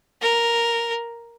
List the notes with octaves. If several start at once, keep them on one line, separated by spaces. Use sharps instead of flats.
A#4